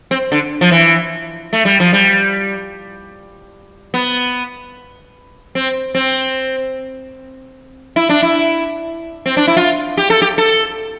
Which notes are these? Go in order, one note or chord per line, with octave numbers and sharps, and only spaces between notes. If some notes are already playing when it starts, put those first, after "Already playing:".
C4
D3
F3
E3
A3
G3
F3
G3
B3
C4
C4
E4
D4
E4
C4
D4
E4
F4
G4
A4
G4
A4